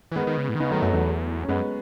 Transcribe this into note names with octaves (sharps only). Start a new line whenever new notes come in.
E3
D#3 G#3 B3
D#3
C#3
A2
D#3
C#3 B3 D#4
D#3 F#3 A3
F#2 F#3 A3
E2 F#3 A3
C#4
F#2 G#3 B3